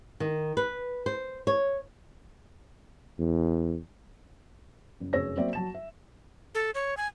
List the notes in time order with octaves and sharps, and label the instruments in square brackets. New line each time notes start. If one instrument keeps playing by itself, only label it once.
[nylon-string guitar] D#3
B4
C5
C#5
[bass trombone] E2
[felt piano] F#1
F1 F#2 G#4 C#5 E6 A#6
F#3 A#3 C4 D5 E5
F#3 A5 E7
E5
[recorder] A4
C#5
G#5